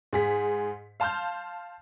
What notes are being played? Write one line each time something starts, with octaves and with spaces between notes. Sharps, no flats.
G#2 G#4 B6
F5 A5 C6 F6 G6